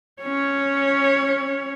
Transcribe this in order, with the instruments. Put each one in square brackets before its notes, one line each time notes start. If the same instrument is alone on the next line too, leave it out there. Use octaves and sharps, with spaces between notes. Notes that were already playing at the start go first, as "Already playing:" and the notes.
[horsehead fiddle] C#4 C#5